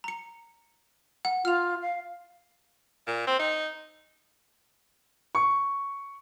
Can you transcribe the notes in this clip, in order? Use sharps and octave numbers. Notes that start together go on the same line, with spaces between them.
A#5 C#7
F#5
F4 F6 F7
F5
A#2
C4
D#4
C#6